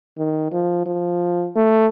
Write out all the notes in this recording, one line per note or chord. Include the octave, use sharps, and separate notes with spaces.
D#3
F3
F3
A3